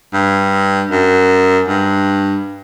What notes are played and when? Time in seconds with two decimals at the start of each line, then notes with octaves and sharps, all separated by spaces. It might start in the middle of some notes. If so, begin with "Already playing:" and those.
0.13 G2
0.91 F#2
1.68 G2